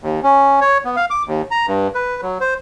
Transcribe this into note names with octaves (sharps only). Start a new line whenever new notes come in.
D#2
C#4
C#5
B3
F5
D6
D#2
A#5
G2
B4
F#3
C5